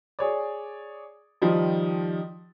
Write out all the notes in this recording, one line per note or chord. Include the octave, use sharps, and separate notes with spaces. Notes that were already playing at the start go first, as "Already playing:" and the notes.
G#4 C#5 D5
D#3 F3 G3 D#4